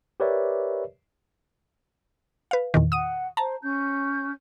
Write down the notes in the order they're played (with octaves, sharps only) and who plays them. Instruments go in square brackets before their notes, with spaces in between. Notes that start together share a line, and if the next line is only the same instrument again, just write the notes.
[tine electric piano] G4 A#4 B4 C#5 D5 E5
[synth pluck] B4 F5
E2 A#2 D#3
[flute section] F#5 [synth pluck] D#6 D#7
[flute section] C5 [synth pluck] A5 A#5
[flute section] C#4 G6